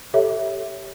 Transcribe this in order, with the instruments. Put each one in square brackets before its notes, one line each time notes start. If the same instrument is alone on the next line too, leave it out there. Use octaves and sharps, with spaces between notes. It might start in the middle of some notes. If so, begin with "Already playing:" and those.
[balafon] G4 A4 C#5 E5